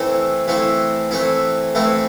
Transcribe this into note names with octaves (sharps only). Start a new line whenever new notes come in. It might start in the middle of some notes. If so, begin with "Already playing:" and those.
Already playing: E3 A3 C4 E4
E3 A3 C4 E4
E3 A3 C4 E4
E3 A3 C4 E4